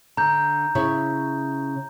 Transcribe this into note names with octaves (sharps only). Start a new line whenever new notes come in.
D3 A#5 G6
C#3 E4 C#5